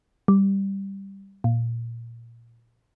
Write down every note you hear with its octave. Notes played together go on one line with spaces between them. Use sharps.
G3
A#2